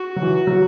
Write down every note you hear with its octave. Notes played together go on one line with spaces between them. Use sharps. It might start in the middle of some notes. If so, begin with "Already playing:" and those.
Already playing: F#4
F#3
E3
F#3